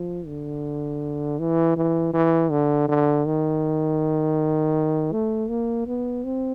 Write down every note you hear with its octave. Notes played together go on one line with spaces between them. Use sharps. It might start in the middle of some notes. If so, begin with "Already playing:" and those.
Already playing: F3
D3
E3
E3
E3
D3
D3
D#3
A3
A#3
B3
C4